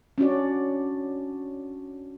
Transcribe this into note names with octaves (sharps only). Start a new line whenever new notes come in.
C#4 D4 F#4 D5